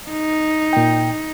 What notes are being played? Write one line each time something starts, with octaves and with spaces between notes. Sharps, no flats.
D#4
A#2 G5